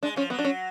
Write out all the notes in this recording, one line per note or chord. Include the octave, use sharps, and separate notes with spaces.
G#3 D4
F3 C#4
F#3 B3
D4
C#4